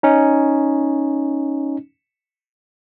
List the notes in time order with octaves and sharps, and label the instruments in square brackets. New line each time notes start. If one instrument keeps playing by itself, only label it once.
[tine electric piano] C#4 D#4